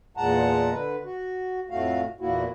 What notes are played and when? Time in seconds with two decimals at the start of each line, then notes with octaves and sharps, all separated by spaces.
0.17 E2 A#2 G#3 F#5 A5 A#5
0.72 D3 B4
1.04 F#4
1.70 F2 A2 A3 F#4 F5
2.21 E2 A#2 A#3 E4 F#4